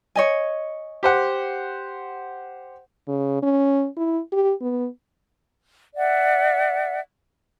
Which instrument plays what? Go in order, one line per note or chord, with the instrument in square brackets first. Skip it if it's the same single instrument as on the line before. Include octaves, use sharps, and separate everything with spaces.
[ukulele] C#5 D#5 G#5
[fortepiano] G4 C5 F#5
[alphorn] C#3
C#4
E4
G4
B3
[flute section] D5 E5 F#5